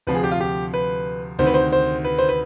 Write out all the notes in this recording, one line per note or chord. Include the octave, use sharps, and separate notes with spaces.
D2 C3 F3 B4
G#4
G4
F4
G4
B4
D2 C3 D#3 C5
B4
C5
C5
B4
C5
B4